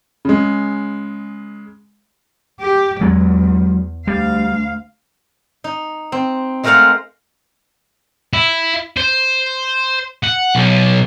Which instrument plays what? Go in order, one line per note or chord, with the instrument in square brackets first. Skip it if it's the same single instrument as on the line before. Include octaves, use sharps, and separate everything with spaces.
[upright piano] C#3 G#3
[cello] G4
[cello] E2 [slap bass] F#3 G#3
[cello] D2 F5 [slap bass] G3
[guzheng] D#4
C4
G#3 A3 A#4 C5 F5 F#5
[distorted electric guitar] E4
C5
F#5
B1